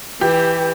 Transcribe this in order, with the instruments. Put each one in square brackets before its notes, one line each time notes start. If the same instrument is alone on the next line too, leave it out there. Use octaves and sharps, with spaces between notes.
[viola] E3 [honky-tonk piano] G4